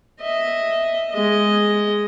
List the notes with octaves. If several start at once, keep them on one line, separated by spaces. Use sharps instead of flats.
D#5 E5
G#3 D#5